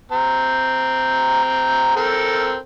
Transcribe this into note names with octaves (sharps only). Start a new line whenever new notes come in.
C4 A#5
C4 A4 A#4